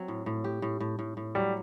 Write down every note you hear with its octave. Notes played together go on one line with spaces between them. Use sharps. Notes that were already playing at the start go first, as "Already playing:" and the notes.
Already playing: F#3 C4
A2
A2
G4
A2
A2
A2
A2
F#3 G3